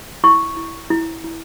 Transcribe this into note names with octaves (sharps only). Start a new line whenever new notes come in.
E4 C#6
E4
E4
E4